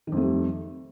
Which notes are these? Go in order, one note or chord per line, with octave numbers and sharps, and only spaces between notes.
F2 D#3 G3 A3